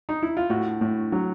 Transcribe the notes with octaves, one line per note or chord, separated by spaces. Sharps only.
D#4
E4
F4
A2 F#4
A2
F#3